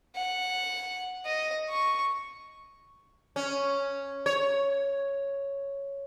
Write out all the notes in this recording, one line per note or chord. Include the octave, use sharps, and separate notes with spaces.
F#5
D#5
C#6
C#4
C#5